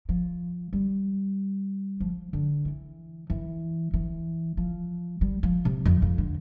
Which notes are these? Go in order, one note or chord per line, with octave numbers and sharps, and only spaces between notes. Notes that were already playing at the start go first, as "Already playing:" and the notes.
F3
G3
F3
D3
E3
E3
E3
F3
G3
F3
C3
F2
F2
D3